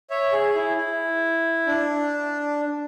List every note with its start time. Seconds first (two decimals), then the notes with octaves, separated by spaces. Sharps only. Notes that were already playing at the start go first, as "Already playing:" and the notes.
0.10 C#5 E5
0.32 G#4
0.55 E4
0.77 E4
1.67 D4